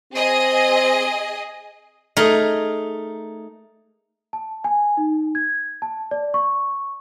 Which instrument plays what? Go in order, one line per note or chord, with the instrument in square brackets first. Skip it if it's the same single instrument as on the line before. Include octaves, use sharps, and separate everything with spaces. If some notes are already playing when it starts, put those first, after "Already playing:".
[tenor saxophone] C4 [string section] G#4 D#5
[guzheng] A3 D#4 G#4 A#4
[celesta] A5
G#5
D#4
G#6
A5
D5
C#6